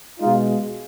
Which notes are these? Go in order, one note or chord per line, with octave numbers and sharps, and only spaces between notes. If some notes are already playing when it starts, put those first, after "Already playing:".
B2 G#3 D#4 F4